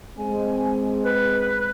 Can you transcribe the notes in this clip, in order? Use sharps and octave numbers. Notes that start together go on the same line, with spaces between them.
G#3 C4 G#5
B4